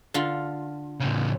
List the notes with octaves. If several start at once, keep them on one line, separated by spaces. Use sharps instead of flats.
D3 F4
A2 C#3